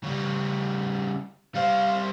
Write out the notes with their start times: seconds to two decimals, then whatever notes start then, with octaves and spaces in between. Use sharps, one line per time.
0.03 C#3 G3
1.55 G3 C5 F5